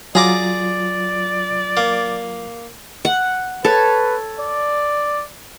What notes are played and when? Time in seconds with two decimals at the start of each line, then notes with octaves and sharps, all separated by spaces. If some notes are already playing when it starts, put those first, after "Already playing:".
0.15 F#3 F4 G#4 D5 A#5 D6
1.77 A#3
3.05 F#5
3.65 A4 B4 C#5
4.39 D5